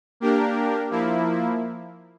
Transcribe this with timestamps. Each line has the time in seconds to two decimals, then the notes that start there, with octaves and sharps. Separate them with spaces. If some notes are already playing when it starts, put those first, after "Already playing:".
0.20 A#3 D4 G4 A#4
0.91 F3 A#3 E4